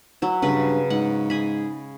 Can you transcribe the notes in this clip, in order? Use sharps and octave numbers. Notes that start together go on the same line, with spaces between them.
F#3 E4
G2 C#3 B4
G#2 F#5
G#4 B5